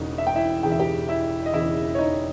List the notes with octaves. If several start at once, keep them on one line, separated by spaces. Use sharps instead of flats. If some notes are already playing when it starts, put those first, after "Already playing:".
Already playing: E1 E2 C#3 D#4
E5
G5
E4 E5
E1 E2 C#3 G5
E5
G4 G5
E4 E5
D#5
E1 E2 C#3 E4 E5
C#5
D#4 D#5